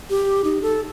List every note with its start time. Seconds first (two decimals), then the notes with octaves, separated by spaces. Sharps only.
0.10 G4
0.44 D#4
0.62 A4